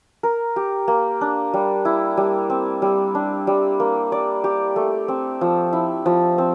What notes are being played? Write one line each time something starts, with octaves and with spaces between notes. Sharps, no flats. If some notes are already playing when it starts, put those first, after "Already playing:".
A#4
G4
A#3
D4
G3
E4
G3
C4
G3
D4
G3
A#3
D5
G4
A3
C4
F3
E4
F3
C4